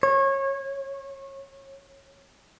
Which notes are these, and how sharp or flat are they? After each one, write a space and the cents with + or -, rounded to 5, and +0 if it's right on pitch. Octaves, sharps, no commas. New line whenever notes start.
C#5 -25